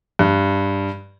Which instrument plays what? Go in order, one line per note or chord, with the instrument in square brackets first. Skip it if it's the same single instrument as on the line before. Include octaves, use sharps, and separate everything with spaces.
[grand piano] G2